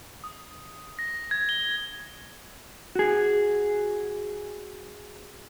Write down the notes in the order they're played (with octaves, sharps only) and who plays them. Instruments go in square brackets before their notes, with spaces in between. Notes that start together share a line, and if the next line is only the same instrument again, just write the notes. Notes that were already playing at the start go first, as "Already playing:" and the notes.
[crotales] D#6
A#6
G#6
G7
[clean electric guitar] F#4 G#4